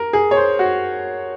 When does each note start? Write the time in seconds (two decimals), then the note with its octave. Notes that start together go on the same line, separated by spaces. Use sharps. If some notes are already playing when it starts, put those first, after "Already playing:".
Already playing: A#4
0.13 G#4
0.31 C#5
0.37 C5
0.59 F#4